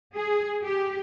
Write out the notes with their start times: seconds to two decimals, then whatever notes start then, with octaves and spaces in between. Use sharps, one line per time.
0.15 G#4
0.64 G4